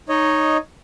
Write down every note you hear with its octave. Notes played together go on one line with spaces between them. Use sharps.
D#4 C#5 D#5